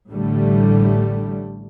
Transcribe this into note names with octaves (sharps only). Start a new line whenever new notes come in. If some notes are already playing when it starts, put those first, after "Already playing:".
A1 A2 D3 G3 A3